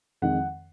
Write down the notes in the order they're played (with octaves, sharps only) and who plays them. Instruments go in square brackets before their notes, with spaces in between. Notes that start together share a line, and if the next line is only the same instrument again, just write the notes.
[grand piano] F2 D#3 G#3 F#5